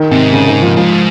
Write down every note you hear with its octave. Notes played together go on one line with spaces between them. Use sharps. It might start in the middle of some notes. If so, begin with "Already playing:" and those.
Already playing: D#3
G#2 C3
C#3
D#3
F3
G#2 F3